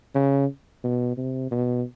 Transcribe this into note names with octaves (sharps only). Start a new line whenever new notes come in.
C#3
B2
C3
B2